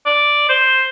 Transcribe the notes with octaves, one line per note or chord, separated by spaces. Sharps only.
D5
C5